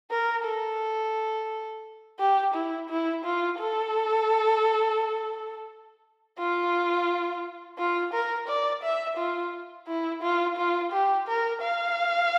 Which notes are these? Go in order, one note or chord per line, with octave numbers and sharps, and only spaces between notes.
A#4
A4
G4
E4
E4
F4
A4
F4
F4
A#4
D5
E5
F4
E4
F4
F4
G4
A#4
F5